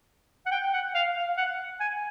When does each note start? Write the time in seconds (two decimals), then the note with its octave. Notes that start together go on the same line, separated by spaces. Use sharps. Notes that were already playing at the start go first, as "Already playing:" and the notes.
0.46 F#5
0.52 G5
0.74 F#5
0.95 F5
1.17 F5
1.38 F#5
1.80 G#5